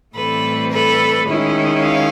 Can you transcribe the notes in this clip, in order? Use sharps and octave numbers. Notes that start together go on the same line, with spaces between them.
A2 E3 G3 C4 A4 B4
A4 B4
D#3 G#3 C#4 E4
F5